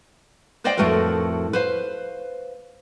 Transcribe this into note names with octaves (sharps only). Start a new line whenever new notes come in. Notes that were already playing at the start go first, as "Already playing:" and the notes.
B4 C5 D5 D#5 F5 G5
F2 A2 A3 F#4 A#4 B4
B4 C5 F5